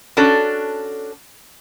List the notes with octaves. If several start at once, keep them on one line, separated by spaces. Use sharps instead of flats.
C#4 D4 F#4 A4